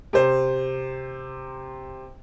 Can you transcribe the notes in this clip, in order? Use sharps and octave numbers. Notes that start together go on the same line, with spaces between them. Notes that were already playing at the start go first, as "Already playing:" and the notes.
C3 C5